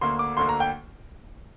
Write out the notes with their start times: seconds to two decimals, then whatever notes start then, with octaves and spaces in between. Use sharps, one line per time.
0.01 D2 D3 A#3 C6
0.19 D6
0.37 D2 D3 A#3 C6
0.49 A#5
0.60 G5